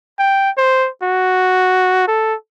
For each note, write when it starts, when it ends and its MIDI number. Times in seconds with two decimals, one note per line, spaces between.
0.19 0.50 79
0.58 0.88 72
1.03 2.04 66
2.08 2.34 69